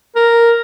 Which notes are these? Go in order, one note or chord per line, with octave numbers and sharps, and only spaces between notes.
A#4